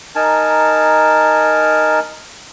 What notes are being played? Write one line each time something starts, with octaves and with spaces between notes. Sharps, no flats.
D#4 A#4 G#5 A5